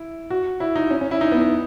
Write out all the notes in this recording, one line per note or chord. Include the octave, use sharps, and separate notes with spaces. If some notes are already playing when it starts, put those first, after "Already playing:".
Already playing: E4
F#4
E4
D#4
C#4
C#4
E4
D#4
B3
D#4